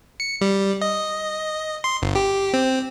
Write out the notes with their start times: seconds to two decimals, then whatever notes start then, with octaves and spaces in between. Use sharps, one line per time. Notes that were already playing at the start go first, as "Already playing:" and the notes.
0.20 C#7
0.41 G3
0.81 D#5
1.84 C6
2.02 G1
2.15 G4
2.53 C4